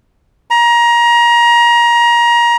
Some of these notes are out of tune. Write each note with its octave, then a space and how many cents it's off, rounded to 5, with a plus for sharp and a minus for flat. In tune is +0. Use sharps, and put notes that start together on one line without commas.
A#5 +25